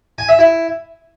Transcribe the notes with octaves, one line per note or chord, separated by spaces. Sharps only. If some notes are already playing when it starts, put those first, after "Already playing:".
G#5
E5
E4